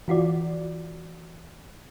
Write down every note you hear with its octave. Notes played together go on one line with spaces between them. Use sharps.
E3 F4 F#4 D5